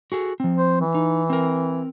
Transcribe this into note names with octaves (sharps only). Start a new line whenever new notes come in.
F#4 G#4 A4
F3 C4
C5
E3
D#4
C4 A#4